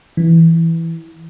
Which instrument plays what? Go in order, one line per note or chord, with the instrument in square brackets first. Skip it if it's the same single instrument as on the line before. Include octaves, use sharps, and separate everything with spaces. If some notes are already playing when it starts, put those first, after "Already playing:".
[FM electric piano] E3